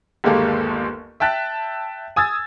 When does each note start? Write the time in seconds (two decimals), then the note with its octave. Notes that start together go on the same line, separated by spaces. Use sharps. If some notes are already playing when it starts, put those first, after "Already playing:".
0.24 G1 D#2 G#3 A#3 G4 A4
1.20 E5 G5 A5 F#6 A6 B6
2.16 G#5 D#6 E6 G#6 A6